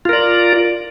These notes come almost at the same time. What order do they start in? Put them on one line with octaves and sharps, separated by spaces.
F4 A#4 D5